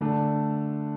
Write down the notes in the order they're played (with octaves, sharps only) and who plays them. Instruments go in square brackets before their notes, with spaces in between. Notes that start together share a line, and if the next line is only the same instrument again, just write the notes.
[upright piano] D3 A3 D4